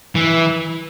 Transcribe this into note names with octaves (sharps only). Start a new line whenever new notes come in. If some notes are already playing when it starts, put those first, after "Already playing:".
E3